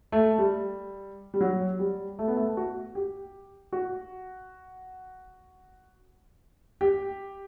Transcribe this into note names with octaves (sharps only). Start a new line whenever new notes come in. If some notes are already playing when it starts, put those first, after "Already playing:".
A3
G3
G3
F#3
G3
A3
B3
A3
F#4
G4
F#4
G4